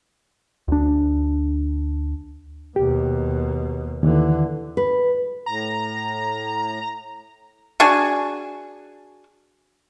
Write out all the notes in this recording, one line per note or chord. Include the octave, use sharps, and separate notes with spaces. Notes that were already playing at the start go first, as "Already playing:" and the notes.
D2 D4
D#2 B2 G4
D#2 D3 E3
B4
A2 A#5
D4 F#4 G#4 G#5